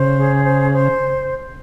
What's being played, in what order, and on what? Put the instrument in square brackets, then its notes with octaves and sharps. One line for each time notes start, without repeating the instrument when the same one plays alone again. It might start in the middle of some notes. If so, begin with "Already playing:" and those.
Already playing: [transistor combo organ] C#3 [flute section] C5
[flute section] G#4
C5
C5